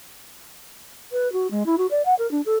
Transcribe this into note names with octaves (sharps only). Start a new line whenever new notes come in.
B4
F#4
G#3
E4
F#4
D5
F#5
A#4
D4
A4